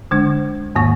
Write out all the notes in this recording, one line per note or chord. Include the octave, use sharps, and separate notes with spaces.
D3 G#3 D4
E2 G#2 D#3 A#3 F#5 C#6